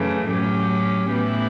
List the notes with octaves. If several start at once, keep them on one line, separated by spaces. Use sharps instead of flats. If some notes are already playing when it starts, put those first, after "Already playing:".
Already playing: F#2 C#3 E3 A3
A2 F#3 C#4 G4
A2 E3 B3 E4 G4